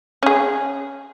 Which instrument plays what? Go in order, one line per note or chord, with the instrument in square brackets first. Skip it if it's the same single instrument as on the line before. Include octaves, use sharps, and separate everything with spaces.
[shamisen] C#4 G#4